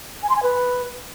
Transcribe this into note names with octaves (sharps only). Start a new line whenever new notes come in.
G#5
C6
G#5
B4